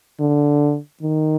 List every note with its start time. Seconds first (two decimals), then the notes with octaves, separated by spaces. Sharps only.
0.20 D3
1.02 D#3